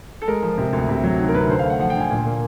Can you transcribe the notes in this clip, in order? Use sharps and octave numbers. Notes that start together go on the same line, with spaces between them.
A4
G#3 A#4
F3
C3
D2
C3
F#3
D#3
A#4
C3 B4
D3 C5
F5
A3 F#5
F3 F#5
G5
D3 G#5
A#2 G#5
A#3